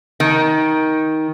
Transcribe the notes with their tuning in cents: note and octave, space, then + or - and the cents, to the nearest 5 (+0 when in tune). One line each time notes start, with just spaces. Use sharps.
D#3 +15